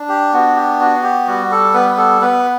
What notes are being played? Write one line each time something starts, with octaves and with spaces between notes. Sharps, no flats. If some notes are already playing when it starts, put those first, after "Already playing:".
Already playing: D4
G4
B3 F#4
G4
F#4
G4
G3 F#4
A4
B3 B4
B4
A4
B3 B4